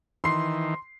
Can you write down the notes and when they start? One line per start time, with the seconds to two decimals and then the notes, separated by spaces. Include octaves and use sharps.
0.24 D#3 E3 C6 C7